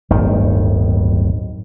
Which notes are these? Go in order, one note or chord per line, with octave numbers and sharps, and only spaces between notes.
D1 G1 D#3